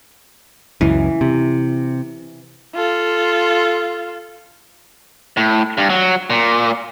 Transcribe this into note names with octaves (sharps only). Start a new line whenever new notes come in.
C#2 F#2 E3
C3
F4 A4
A2
G2
F#3
A#2